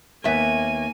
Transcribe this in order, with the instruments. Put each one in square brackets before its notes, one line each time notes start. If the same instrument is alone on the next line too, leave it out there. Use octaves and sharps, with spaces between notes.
[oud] D#2 B3 E5 [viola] A#3 G#5